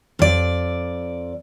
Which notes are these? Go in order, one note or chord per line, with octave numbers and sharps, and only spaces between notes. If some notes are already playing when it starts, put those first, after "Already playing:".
F2 D5